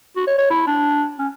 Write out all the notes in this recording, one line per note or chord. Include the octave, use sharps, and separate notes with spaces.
F#4
C#5
C#5
E4
D4
C#4